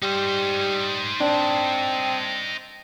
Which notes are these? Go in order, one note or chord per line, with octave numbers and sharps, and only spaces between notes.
G3 D#4 C5
C4 D4